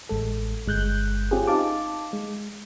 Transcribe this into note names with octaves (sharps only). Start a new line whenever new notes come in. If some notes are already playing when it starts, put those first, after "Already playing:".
A1 G#3 A4
G1 G#3 F#6 G6
C4 C#4 F4 G4 G#4
D#4 F5 A5 D6
G#3